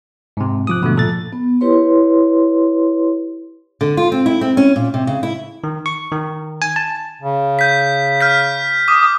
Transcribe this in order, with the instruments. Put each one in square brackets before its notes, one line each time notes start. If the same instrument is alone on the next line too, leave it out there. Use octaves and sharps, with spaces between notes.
[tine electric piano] G#2 C3
[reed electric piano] G#2 F3 F#6 [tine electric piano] D6 D#6
[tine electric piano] B2 D3 A3
A#2 A4 A6
[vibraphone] B3
E4 G4 B4 C#5 C6
[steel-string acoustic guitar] D3
F4
C4
E4
C4
C#4
A#2
C3
C#3
E4
[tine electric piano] D#3
C#6
D#3
G#5
A5
[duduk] C#3
[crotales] G6 B6
F6 G6 B6
[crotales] D6 [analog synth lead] D#6